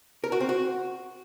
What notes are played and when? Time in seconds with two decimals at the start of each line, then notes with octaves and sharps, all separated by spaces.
0.24 A#4
0.32 F#4
0.40 C4
0.49 F#4